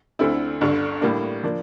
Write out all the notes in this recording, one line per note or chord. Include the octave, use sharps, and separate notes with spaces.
D2 D3 A3 C4 E4
G1 G2 D3
A2 G3 A#3 D4
F3 A#3 D4